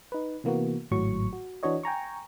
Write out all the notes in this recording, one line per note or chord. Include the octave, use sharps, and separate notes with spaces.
D#4 B4
C3 E3 A#3 B3 F#4
G#1 A2 F#3 C#6
F#4
E3 D4 F#4 C#5 D#5
G5 G#5 A#5 C#6